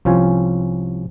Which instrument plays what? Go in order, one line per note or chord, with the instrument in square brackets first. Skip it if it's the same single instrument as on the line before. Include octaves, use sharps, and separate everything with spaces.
[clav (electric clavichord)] C2 F3 C#4 F4 G#5